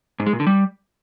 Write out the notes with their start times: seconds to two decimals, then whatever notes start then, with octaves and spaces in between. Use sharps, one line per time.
0.20 G#2
0.26 G#3
0.33 A#2
0.40 D3
0.47 G3